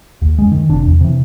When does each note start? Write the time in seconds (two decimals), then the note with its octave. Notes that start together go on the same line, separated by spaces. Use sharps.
0.22 D#2
0.39 F#2 G#3
0.52 D#3
0.69 F#1 C3 D4
0.87 E2
1.01 C3 E3